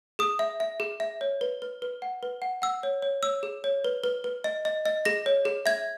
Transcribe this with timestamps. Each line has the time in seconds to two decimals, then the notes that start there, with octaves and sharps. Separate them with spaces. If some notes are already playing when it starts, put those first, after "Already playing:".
0.19 G#4 D#6
0.39 E5
0.60 E5
0.80 G#4
1.00 E5
1.21 C#5
1.41 B4
1.62 B4
1.82 B4
2.02 F#5
2.23 B4
2.42 F#5
2.62 F#5 E6
2.83 C#5
3.02 C#5
3.23 C#5 E6
3.43 G#4
3.64 C#5
3.85 B4
4.04 B4
4.24 B4
4.44 D#5
4.65 D#5
4.85 D#5
5.05 G#4 A#6
5.26 C#5
5.45 G#4
5.66 E5 G#6